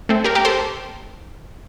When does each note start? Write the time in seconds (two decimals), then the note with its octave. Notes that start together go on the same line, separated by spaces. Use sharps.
0.09 A3 C4
0.24 G4 A#4
0.35 G4 A#4
0.45 A4 C5